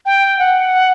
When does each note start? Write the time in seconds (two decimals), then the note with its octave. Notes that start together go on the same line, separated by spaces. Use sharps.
0.06 G5
0.39 F#5